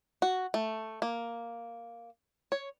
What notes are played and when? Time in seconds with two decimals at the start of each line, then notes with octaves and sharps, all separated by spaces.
0.22 F#4
0.54 A3
1.02 A#3
2.52 C#5